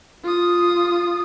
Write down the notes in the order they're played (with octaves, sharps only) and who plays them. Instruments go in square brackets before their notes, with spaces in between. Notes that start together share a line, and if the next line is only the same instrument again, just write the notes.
[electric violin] F4 D#6